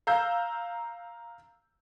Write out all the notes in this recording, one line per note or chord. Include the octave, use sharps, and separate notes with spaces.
F5 A#5 E6 G6